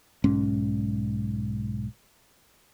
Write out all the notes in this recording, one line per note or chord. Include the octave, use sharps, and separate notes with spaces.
B1 G#2 C#4